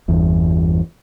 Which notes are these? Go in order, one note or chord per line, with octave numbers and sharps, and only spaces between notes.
G1 E2